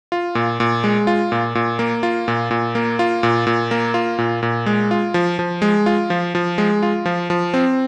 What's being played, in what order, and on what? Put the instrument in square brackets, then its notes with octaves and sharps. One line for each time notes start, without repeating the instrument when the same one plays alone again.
[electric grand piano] F4
A#2
A#2
G#3
F4
A#2
A#2
A#3
F4
A#2
A#2
A#3
F4
A#2
A#2
A#3
F4
A#2
A#2
G#3
F4
F3
F3
G#3
F4
F3
F3
G#3
F4
F3
F3
C4